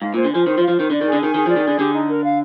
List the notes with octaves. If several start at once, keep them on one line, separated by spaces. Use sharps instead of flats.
G#2 F5
A#2 C5
D3
F3 G#5
D#3 C5
F3
F5
F3
D#3 C5
D3 D5
D#3 G#4
D3
D#3 G#5
D#3 G#4
F3 D5
D#3
D3 G#4
D3 G4
D#4
A#4
F5